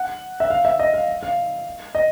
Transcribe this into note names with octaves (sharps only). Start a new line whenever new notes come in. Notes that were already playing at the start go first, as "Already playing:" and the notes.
Already playing: F#5
E5
F5
E5
D#5
F5
F5
D#5